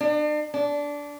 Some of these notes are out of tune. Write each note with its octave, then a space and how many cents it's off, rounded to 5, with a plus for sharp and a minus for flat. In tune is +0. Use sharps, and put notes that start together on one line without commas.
D4 +40
D4 -15